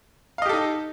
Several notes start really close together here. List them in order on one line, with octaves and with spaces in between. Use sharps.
F5 D#5 G4 A4 D#4